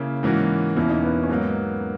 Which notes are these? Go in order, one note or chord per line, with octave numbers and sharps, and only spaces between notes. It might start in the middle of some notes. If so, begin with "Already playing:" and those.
Already playing: C#3 A#3 E4
G#2 E3 A#3 C#4 F#4
E2 B2 A#3 C#4 E4
D#4
B3
C#4
G#2 F#3 A#3 B3